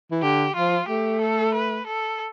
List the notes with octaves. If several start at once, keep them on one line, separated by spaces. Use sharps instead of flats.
E3
D3 G4
F3 F4
A3 G4
A4
B4
A4